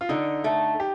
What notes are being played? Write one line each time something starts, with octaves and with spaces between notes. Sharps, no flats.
F4
D3 D#4
A3
G4